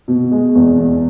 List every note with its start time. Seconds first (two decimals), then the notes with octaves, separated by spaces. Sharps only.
0.08 B2
0.31 G#3
0.55 E2
0.78 E2